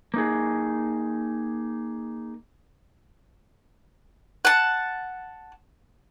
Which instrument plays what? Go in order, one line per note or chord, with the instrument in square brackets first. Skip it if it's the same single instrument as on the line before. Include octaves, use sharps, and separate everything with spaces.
[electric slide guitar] A#3 D#4 G#4
[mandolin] F#5 A5